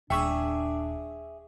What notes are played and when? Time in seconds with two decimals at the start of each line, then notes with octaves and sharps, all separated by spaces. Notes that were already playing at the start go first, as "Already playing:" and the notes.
0.10 D#1 D4 G#4 E5 G5 C#6 E6